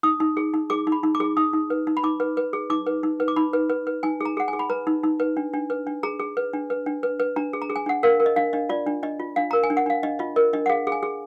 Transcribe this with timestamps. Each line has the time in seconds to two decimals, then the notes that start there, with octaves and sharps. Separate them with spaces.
0.03 D#4 D#6
0.20 D#4
0.37 G#4
0.54 D#4
0.70 G#4 D6
0.87 D#4
0.92 B5
1.03 D#4
1.15 D6
1.20 G#4
1.37 D#4 D#6
1.53 D#4
1.70 B4
1.87 D#4
1.97 B5
2.03 D#4 D6
2.20 B4
2.37 B4
2.53 G#4
2.70 D#4 D6
2.87 B4
3.03 D#4
3.20 B4
3.28 D6
3.36 D#4 B5
3.53 B4
3.70 B4
3.87 B4
4.03 D#4 G#5
4.21 G#4 A#5
4.37 G#4 F#5
4.48 G#5
4.53 G#4
4.59 B5
4.70 B4 A#5
4.87 D#4
5.04 D#4
5.20 B4
5.37 D4
5.54 D4
5.70 B4
5.87 D4
6.03 G#4 A#5
6.20 G#4
6.37 B4
6.53 D4
6.70 B4
6.86 D4
7.03 B4
7.20 B4
7.36 D4 A#5
7.53 G#4
7.62 A#5
7.70 G#4
7.76 G#5
7.86 D4 F#5
8.03 A#4 F5
8.20 A#4
8.26 D#5
8.36 D4 F5
8.53 D4 D#5
8.69 F4 D5
8.87 D4
9.03 D4 D#5
9.20 F4
9.36 D4 F5
9.51 A#4 A#5
9.63 G#5
9.70 D4
9.77 F#5
9.86 D4 F5
10.03 D4 D#5
10.19 F4 D#5
10.36 A#4 D#5
10.53 D4 D#5
10.66 F#5
10.69 G#4 F5
10.87 G#4
10.92 G#5
11.03 G#4